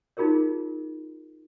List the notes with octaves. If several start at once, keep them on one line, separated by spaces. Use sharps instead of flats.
D#4 F4 G#4 A#4 C#5